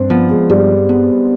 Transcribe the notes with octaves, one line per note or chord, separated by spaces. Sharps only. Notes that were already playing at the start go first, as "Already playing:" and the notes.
Already playing: G2 C4 D4
F3 B3
G#3
G2 G3
B3